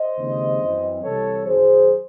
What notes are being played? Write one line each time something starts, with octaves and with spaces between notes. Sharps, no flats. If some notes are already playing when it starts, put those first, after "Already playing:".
Already playing: C5 D#5
D#2 C#3 G#3 C4
F#2 E3 C4
C2 C3 E3 A4 C#5
F#2 D#3 F#3 G#4 C5